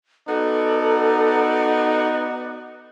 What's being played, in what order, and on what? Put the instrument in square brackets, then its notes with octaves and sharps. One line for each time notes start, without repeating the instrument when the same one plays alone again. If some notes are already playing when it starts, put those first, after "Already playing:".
[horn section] B3 F#4 D5 [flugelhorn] D#4 [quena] A4